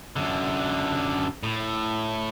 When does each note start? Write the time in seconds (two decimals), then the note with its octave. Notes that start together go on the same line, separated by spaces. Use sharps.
0.16 F#2 D3
1.43 A2